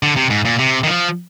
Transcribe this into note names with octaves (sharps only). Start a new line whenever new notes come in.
D3
C3
G#2
A#2
C3
D#3
F3